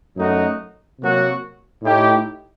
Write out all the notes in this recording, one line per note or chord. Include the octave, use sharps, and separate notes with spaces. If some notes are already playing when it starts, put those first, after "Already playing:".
F#2 F#3 A3 D#4 F#4
C3 F#3 A#3 F#4
A2 A3 D#4 G4